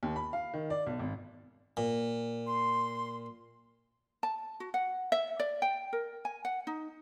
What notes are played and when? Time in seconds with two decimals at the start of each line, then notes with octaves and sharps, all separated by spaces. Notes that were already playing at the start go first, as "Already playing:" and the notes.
0.03 D#2
0.16 B5
0.33 F5
0.54 D#3
0.70 D5
0.86 B1
0.99 G#1
1.77 A#2
2.46 C6
4.23 A5
4.60 F#4
4.74 F#5
5.12 E5
5.40 D5
5.62 G5
5.93 A#4
6.25 G#5
6.45 F#5
6.67 D#4